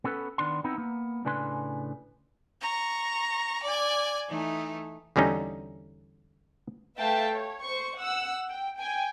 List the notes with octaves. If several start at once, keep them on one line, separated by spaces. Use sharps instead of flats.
B3 C#4 A4 B4
D#3 B3 D4 C6
B3 C4 D#4 E4
A#3 B3
A2 C#3 D4 B4 G#5 C6
A#5 C#6
D5 G#5
E3 A3 D#4
E2 D3 G3 C#4 D#4
A3 B4 E5 F5 G5 A5
C#5
C5 C#6
F#5 E6
G5
G5 G#5